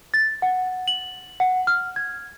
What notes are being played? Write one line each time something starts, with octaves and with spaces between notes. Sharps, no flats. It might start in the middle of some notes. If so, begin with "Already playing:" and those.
A6
F#5
F#7
F#5
F6
G#6